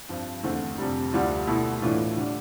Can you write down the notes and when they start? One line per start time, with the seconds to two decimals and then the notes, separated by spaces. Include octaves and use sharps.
0.09 G2 F3 C4
0.43 E2 D3 A3 C4
0.78 F2 C3 G3
1.13 D2 D3 G3 D4 F4
1.47 B2 A3 E4
1.82 A2 E3 A3 D4 F4
2.17 D3 G3 D4